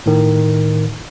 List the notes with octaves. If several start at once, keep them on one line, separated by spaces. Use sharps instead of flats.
A2 D#3